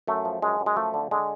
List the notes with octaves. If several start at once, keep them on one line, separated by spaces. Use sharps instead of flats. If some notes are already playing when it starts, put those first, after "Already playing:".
F#2 A3
F3
F#2 G#3
F#2
G#3
F3 A3
D3
D3 G#3